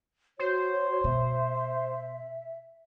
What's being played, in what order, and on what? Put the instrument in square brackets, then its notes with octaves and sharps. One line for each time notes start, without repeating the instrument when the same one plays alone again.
[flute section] F#4 C#5 [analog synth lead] C5
[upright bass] B2 [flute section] E5